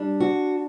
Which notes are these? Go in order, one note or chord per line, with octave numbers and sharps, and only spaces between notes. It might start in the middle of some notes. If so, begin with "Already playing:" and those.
Already playing: G3 D4
F#4